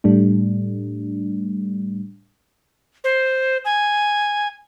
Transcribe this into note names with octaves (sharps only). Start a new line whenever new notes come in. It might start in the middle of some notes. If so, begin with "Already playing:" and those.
A2 G3 A3 D4
C5
G#5